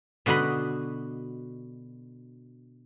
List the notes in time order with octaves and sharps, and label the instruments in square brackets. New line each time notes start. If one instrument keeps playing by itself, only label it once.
[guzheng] B2 D3 F#4 D#5 B5